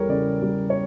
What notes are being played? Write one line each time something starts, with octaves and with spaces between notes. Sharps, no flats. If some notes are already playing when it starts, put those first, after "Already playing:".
Already playing: E2 G3 A4 A#4 C#5
C#3 D5
G3
C#5